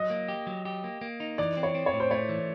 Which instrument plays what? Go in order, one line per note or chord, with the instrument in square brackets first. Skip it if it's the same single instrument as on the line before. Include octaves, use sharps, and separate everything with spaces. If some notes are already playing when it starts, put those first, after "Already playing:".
Already playing: [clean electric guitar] F#3 [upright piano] D#5
[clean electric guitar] A#3
G4
F#3
G4
A#3
A#3
D#4
[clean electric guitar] E3 [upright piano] D5
[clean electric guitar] C4
[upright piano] C#5
[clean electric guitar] C4
[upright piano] C#5
[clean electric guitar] A2
[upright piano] C5
[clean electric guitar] A3 [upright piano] C#5
[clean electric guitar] E3